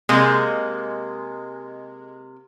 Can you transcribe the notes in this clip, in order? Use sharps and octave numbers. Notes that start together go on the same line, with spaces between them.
C3 G#3 A#3